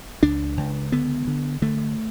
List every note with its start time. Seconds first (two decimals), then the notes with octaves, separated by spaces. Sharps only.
0.22 C#2 D4
0.57 C#2
0.92 D3 B3
1.27 D3
1.62 D3 A3